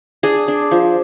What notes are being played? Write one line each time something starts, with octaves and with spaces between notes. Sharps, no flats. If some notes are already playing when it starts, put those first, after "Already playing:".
D4 G#4
D4
F3